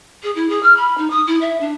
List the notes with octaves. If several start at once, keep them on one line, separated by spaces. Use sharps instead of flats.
G#4
E4
G#4
F6
B5
D#4
D#6
E4
E5
D4